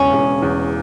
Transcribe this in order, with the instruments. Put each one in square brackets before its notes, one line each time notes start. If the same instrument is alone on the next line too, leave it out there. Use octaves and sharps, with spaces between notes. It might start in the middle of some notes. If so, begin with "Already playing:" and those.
Already playing: [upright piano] E1 E2 C#3 [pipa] C#4
[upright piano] E1
E2